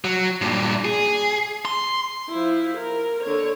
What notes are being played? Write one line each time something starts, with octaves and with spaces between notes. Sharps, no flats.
F#3
G2 A#2
G#4
C6
F3 E4
A#4
D3 C#5